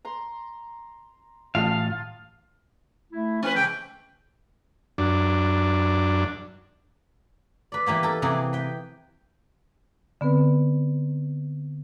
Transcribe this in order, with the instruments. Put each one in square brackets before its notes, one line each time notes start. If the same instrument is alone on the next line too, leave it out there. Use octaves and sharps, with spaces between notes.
[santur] A#5 C6
[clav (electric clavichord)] A1 [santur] F4 A4 D#6 [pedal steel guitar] F5
[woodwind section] A3 E4
[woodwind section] F3 A3 C#4 [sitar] C4 B4
[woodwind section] C#3 E3 [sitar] G#3 [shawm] G5
[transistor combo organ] F#2 D4
[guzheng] B4 D5
E3 G3 A#3 B3
A4 A#4
C3 E3 A#3 C4 E4 G#4
B4 G5
[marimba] D3 B3 C4 B4